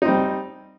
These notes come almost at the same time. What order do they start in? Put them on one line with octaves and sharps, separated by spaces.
D#4 C4 G3